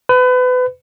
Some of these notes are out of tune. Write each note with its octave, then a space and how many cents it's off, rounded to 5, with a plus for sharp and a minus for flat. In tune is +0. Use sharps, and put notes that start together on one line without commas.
B4 +30